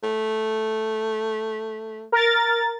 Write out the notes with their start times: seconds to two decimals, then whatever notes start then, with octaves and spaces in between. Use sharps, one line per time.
0.04 A3
2.12 A#4 A6